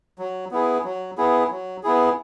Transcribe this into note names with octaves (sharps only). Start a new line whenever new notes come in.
F#3
B3 E4 G#4
F#3
B3 E4 G#4
F#3
B3 E4 G#4